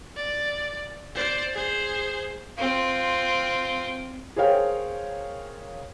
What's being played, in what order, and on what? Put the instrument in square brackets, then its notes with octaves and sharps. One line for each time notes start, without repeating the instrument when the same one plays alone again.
[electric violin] D5
C5 D5
G#4 C5
[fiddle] C4 F4
[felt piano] G#4 A#4 C5 C#5 F5 G5